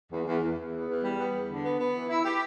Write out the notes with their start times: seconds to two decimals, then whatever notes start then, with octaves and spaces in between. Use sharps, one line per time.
0.11 E2
0.26 E2
0.42 E2
0.57 E2
0.71 B3
0.87 E2
1.02 G3
1.18 B3
1.32 E2
1.48 D3
1.63 B3
1.79 B3
1.93 E3
2.09 E4
2.25 G4